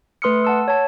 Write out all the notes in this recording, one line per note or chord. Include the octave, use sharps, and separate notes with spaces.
A3 B4 C6 D#6 F6 C#7
F#5 A5 E6
C#5 A5